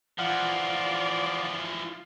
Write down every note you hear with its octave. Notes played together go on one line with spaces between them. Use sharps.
E3 F3 F4 D5 F#5 F6